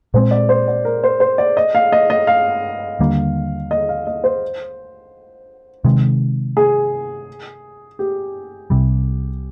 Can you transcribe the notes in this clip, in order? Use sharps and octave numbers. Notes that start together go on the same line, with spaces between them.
A#2 G#3 C4 C5
D5
C5
D5
A#4
C5
C5
D5
D#5
F5
D#5
D#5
F5
D#2 D3 G3 A#3
D#5
F5
D#5
C5
C3 D#3 G#3
G#4
G4
C2 C3 G3